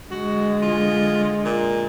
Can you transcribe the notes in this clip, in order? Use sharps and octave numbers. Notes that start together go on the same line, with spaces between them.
D3 G#3 F#4
F4
A#2